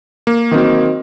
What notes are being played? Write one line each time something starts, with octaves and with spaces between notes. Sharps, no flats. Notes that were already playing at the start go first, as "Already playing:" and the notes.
A#3
D#3 F#3 C4